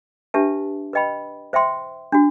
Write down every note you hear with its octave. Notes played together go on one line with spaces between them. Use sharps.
D4 G4 B4 E5 A5
B4 D#5 G5 B5
C5 E5 G5 C6
D4 F#4